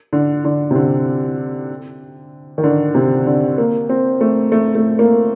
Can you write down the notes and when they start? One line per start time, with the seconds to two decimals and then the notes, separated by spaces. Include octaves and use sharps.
0.13 D3
0.45 D3
0.71 C3
0.76 D3
2.58 D#3
2.64 D3
2.95 C3
3.27 D3
3.58 A#3
3.89 C4
4.21 A3
4.52 A3
4.75 A3
4.99 A#3